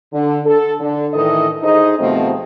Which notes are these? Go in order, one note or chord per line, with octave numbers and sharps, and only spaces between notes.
D3
A4
D3
A2 D#3 E3 A4 D#5
D#4 G#4 C5 D#5
D#2 B2 F3 A3 C4